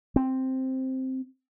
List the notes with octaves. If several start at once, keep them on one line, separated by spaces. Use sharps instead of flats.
C4